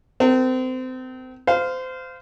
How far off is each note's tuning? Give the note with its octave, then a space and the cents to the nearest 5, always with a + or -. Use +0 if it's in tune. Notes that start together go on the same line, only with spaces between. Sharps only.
C4 -30 A#4 -40
C5 -25 F5 +0